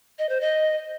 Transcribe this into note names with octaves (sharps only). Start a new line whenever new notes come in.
D#5
C5
D#5